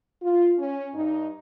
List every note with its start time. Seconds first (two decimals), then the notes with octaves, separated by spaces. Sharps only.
0.22 F4
0.58 C#4
0.94 G2 D#4